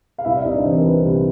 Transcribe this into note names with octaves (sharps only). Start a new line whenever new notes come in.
F5
C2 E4 E5
D5
C2 D#4 D#5
D4 D5
E3 C4 C5
A#4
C2 B4
C2